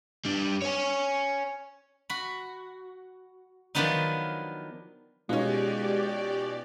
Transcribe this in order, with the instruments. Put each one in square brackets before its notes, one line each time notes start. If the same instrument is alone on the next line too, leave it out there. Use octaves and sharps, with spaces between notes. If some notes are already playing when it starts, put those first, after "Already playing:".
[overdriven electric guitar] G3 D4
C#5 G#5
[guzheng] F#4 B5
D#3 F3 F#3 B3 D4 D#4
[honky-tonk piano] B2 C#4 [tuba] G#3 [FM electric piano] D#4 F4 [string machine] G4 D5